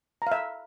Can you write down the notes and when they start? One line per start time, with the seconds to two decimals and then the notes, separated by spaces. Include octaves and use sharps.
0.22 A#5
0.27 F5
0.32 E5